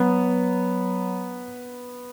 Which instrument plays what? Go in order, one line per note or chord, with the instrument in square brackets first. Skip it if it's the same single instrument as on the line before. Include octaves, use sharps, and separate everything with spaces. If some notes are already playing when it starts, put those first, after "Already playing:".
Already playing: [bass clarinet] F#3 [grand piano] B3